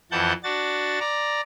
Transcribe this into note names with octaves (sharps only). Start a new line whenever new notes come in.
F2 E3 F#5 A5 G6
D4 F#4 A6
D5 A#5